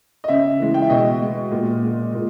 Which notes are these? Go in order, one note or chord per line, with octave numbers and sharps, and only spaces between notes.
D#5
C#3 E5
E3 G#3
G5
E5
B2 D#5
G#3
A#2
G#3
A#2